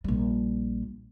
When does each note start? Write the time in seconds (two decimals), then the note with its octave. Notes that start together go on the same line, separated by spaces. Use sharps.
0.04 A#1 G3